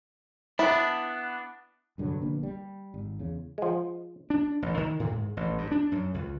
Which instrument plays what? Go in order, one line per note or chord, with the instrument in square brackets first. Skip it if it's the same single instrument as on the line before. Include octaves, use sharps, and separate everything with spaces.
[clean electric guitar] B3 D4 [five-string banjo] E4
[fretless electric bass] C2 G2 D3 F#3
A#1 D3 A#3 B3
G3
G#1
E2 C#3
[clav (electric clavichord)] F3 G#3
[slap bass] D4
A1
D#3
A2
G#2
A1
G2
D4
F#2
C#2